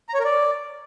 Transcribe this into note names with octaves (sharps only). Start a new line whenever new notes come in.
A#5
C#5
A#4
D5